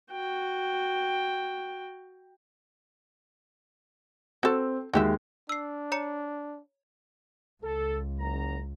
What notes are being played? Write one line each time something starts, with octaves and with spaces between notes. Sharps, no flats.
F#4 G5
C4 F#4 A4
D#2 G#3 F#4 G4 E5
D4 E6 C7
C#5 A#5 C#7
C#2 A4
F#1 F#2 A#5